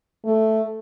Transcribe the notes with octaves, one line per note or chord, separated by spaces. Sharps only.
A3